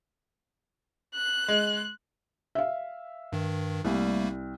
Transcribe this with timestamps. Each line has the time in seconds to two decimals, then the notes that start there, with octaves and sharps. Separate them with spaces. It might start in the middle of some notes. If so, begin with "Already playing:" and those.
1.15 F#6
1.48 G#3
2.55 E5 F5
3.32 G2 D#3
3.85 C2 G3 A3 A#3